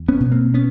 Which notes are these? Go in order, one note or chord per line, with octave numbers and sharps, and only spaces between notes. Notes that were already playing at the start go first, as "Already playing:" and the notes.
Already playing: E2
B3 C#4
B2
A#3 C4
B3 C#4